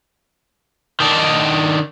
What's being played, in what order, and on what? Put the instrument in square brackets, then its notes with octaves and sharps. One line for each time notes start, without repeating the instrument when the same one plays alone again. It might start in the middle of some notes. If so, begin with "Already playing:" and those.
[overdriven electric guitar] D#3 D4